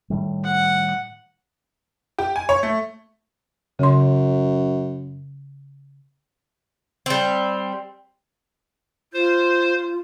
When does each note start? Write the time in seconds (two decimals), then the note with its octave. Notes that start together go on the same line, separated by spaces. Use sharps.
0.10 A2 D#3 G3
0.44 F#5
2.19 G4
2.36 G#5
2.49 C#5
2.63 A3
3.79 F#2 C#3 C6
7.06 G3 C4
9.13 F4 C5